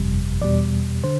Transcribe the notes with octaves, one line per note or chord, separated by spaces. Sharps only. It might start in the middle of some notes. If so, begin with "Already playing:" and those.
Already playing: G1 F2 C3 G3
E2 B2 G3 D5
D3 C5